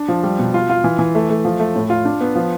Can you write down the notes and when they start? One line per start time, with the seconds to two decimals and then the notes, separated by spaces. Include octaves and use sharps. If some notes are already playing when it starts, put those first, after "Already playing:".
Already playing: D4
0.08 F3
0.23 G3
0.39 B2
0.54 F4
0.69 F4
0.84 E3
0.99 E3
1.15 A3
1.29 A3
1.45 F3
1.60 A3
1.76 A2
1.90 F4
2.05 D4
2.21 B3
2.35 F3